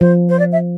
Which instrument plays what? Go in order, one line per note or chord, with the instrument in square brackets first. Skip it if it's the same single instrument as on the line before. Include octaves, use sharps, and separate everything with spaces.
[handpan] F3 [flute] C5
[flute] C5
D5
E5